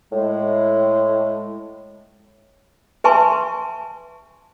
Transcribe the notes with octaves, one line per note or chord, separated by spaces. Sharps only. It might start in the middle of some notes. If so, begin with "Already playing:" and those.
A2 G#3
B4 E5 G#5 A5 C6 C#6